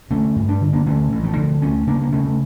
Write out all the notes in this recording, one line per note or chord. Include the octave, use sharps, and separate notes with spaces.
D3 A3 C#4
G2
D4
D3
A#3 D4
D3 A3 C#4
A1
F3 A3
D3
D2 A3 C#4
C#3 A#3 D4
A#3
C#3 A3 C#4
A3